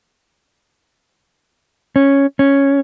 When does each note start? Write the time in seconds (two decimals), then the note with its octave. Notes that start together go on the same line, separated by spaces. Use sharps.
1.96 C#4
2.39 C#4